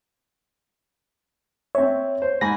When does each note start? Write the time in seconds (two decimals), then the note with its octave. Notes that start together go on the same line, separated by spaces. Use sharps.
1.75 C4 C#5 E5
2.22 C5
2.41 G#2 G#5 B5 A#6